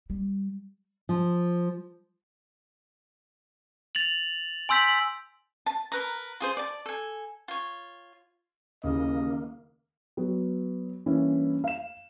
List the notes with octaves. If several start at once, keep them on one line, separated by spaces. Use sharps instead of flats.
G3
F3
A6 F7 F#7
G#5 C6 E6 G6 B6 F#7
A5
A#4 B4 A#5
F4 G#4 C5
D5 A5
A4 G#5
F4 C#5
D#2 C#3 E3 A#3 D#5
F#3 B3
G2 E3 A#3 C#4 E4
F5 E7